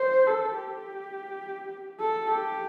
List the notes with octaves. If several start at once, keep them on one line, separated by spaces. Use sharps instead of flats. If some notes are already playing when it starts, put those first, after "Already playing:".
Already playing: C5
A4
G4
A4
G4